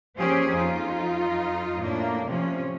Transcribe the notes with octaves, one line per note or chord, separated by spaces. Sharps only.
F3 A#3 C#4 G4 G#4 C5
F2 D#4 F4
A2 A#3 D4
C3 F3 C#4